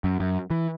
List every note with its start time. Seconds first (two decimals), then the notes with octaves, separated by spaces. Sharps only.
0.04 F#2
0.20 F#2
0.50 E3